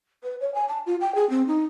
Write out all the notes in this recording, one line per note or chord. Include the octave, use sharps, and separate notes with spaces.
B4
C#5
G#5
A5
F4
G5
G#4
C4
D#4